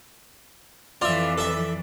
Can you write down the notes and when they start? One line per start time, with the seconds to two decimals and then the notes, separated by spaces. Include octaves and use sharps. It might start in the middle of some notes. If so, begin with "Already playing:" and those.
1.01 F2 E3 F4 D5 E5
1.38 A4 E5